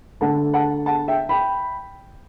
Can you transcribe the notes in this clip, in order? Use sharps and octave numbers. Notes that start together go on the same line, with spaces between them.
D3 A3 F#5 A5
F#5 A5
F#5 A5
E5 G5
G5 B5